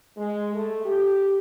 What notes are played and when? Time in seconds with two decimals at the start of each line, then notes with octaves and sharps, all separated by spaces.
0.18 G#3
0.54 A3
0.86 G4